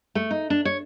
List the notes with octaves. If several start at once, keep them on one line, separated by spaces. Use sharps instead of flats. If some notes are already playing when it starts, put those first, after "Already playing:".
A3
D#4
D4
C#5